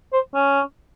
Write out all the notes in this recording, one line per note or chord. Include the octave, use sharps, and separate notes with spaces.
C5
C#4